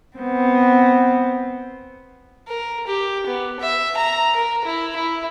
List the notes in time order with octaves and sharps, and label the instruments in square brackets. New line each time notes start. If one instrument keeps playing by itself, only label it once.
[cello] B3 C4
[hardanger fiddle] A#4
G4
B3
E5
A#5
A#4
E4
E4